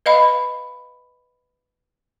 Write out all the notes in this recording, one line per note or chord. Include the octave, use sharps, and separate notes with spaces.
B4 D#5 F5 B5